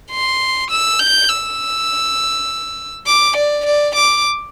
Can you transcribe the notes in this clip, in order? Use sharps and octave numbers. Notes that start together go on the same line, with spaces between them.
C6
E6
G6
E6
D6
D5
D5
D6